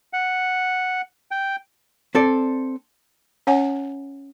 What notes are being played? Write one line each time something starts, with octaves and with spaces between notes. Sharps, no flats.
F#5
G5
C4 A4 D5
C#4 C#5 F#5 G#5